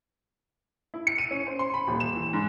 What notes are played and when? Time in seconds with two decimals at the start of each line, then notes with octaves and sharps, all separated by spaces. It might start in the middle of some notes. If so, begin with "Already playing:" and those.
0.94 E4
1.07 C#7
1.18 D#7
1.31 C#4
1.47 C5
1.59 C6
1.74 B5
1.88 D#1
2.00 E7
2.15 E3
2.33 G#2